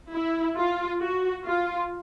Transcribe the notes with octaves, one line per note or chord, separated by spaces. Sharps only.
E4
F4
F#4
F4